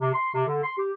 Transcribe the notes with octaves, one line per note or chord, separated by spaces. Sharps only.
C3
C6
C3
D3
C6
G4